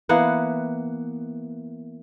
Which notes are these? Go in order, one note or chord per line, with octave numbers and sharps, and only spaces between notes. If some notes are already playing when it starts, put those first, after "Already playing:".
E3 A#3 B3 F#5